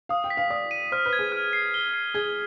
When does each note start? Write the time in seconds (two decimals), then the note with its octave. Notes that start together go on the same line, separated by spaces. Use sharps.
0.09 F5 D#6
0.24 G5
0.30 B6
0.37 F5
0.50 D5 D#6
0.71 D#7
0.92 C5 F6
1.06 B4
1.13 G#6
1.19 G#4
1.32 F6
1.53 C7
1.74 G7
1.94 C7
2.14 G#4 G#6